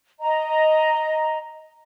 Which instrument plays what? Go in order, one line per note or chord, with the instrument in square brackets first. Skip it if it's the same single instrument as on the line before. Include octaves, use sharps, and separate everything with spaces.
[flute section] D#5 A#5